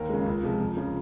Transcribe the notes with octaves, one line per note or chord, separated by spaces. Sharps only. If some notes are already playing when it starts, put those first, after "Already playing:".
Already playing: D#2 A#4
C#3 G#3
C#2
C3 F3 G#3
F2
C#3 F3